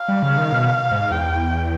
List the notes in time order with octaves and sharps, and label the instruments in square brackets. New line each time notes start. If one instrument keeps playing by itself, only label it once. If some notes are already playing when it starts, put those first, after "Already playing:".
Already playing: [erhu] F5
[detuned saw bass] G3
C#3
D#3
B2
G#2
[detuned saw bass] E2 [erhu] G5